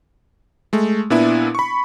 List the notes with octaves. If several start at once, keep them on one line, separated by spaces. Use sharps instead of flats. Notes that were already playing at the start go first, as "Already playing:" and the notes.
G#3 A3
A#2 B3 D4 E4
B5 C#6